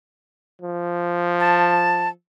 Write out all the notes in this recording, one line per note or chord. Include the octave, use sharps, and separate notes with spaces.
F3
A5